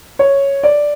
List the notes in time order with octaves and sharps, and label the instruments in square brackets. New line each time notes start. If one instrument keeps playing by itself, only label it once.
[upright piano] C#5
D5